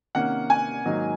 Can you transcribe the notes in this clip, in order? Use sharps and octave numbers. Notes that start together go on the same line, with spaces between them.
C3 D#3 A#3 C#4 F#5
G#5
G#2 D#3 F#3 A#3 D#4